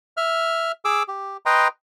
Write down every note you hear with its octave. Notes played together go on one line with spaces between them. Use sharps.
E5 F6
G#4 D6 E6
G4
B4 D#5 G5 A#5 C6